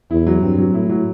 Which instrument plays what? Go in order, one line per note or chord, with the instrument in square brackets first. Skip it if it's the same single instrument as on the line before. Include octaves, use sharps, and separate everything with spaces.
[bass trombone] E2 [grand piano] E4
[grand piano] F#3
[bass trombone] G2 [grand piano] C4
[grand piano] F#3
[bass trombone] A2 [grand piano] E4
[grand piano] F#3